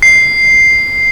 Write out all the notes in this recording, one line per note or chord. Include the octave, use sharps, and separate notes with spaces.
C7